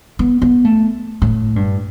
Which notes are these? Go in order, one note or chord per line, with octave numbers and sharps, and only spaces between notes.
B3
B3
A3
A2
G2